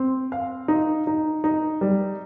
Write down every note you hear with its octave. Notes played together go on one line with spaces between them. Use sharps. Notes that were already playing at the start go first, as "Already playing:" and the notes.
Already playing: C4
F5
D#4
D#4
D#4
G3